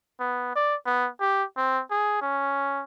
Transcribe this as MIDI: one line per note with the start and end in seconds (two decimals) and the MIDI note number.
0.20 0.54 59
0.55 0.75 74
0.86 1.09 59
1.20 1.44 67
1.57 1.82 60
1.91 2.19 68
2.21 2.84 61